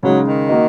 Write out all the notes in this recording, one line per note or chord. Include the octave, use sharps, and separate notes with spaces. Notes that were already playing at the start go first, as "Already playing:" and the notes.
C#3 F#3 G#3 D#4
D#3
A#3 F#4 D#5